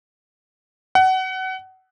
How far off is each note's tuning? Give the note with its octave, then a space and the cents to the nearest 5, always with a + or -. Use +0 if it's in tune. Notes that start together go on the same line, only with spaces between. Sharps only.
F#5 +25